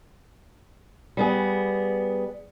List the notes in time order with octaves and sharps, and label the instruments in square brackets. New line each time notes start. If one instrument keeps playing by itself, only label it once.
[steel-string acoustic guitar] G3 B3 G#4